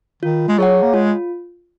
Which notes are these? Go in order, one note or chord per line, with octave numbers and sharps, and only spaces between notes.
D#3 F4
G#3
F#3 G#4 C#5 F#5
A#3
G#3 F4